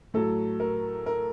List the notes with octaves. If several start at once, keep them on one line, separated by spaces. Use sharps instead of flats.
A2 F#3 A4
A#4
A#4